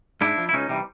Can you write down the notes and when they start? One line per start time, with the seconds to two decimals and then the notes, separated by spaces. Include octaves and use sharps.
0.21 G#2 D4 E4
0.38 F3
0.49 E4
0.53 C#2 C#4 D#4
0.69 C3 E3 G3